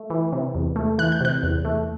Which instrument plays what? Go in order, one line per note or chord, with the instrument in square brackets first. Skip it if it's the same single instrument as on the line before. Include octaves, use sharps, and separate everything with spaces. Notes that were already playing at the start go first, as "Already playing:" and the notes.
Already playing: [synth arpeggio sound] A3
E3
C3
E2
A3
E3 F#6
G6
C3 F#6
E2
A3